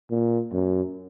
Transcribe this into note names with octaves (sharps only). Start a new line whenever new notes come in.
A#2
F#2